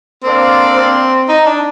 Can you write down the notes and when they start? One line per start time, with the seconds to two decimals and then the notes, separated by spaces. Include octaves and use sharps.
0.24 A#3 C4 D4 A4 D5 F5
0.76 C4
1.29 D#4
1.46 D4